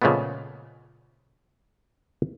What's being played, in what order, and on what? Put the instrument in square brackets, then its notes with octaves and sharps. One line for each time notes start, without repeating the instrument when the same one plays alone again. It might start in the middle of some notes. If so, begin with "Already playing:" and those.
[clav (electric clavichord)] A#2 C#3 F3 G#3 A3 B3